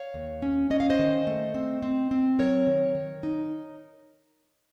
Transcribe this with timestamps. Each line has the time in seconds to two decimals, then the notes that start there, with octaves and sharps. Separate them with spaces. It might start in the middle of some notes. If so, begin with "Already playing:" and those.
Already playing: C#5 F5
0.14 D#2
0.42 C#4
0.70 C#4 D#5
0.80 F5
0.90 C5 D#5
0.99 D#3
1.27 A3
1.54 C4
1.82 C4
2.11 C4
2.39 F#3 A#4 C#5
2.67 D#3
2.95 D#3
3.23 D#4